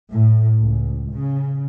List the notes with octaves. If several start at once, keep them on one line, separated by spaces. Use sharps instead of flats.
A2
C#2
C#3